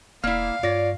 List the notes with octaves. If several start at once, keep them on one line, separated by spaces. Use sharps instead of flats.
E1 A#3 E4 D5 F5 F6
G2 F4 C#5 D5 A#6